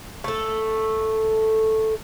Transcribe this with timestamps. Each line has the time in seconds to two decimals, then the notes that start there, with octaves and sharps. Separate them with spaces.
0.24 A3 A4